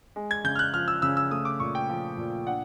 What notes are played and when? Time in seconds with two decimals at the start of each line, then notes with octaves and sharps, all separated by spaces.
0.16 G#3
0.31 G#6
0.44 C#3 G6
0.56 F6
0.59 F#6
0.74 F3 F6
0.88 E6
1.02 C#3 E6
1.17 E6
1.31 A3 D#6
1.45 D6
1.60 A#2 C#6
1.75 G5
1.89 F3
2.18 A#2
2.47 D4 F#5